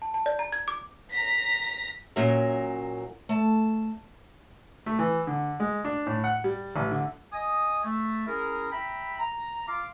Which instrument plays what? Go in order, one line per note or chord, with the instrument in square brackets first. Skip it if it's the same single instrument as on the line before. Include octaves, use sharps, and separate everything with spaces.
[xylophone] A5
A5
D5
A#5
G#6
D6
[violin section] A#5 A#6 B6
[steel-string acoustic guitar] A#2 F#3 C#4 A#4 E5
A3 A5
[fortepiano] A3
E3
D3
G#3
D4
A2
F#5
G3
A1
D3
[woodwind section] D#5 G#5 D#6
A3
C#4 E4 G#4 A#4
E5 G5 A#5 B5
A#5
F4 F5 D6